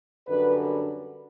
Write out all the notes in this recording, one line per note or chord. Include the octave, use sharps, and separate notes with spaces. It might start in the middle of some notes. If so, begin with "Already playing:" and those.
F#2 D3 G3 B4